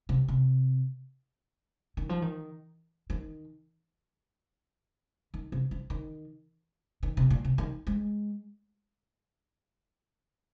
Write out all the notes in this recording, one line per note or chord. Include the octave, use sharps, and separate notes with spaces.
C3
C3
D#3
F3
D#3
D#3
D#3
C3
F3
D#3
D#3
C3
A#2
C3
D#3
G#3